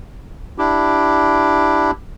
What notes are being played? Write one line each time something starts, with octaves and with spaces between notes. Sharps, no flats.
D4 E4 G4